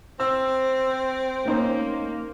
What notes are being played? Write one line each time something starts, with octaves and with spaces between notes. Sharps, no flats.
C4 E6
A#3 C#4 D#4 C5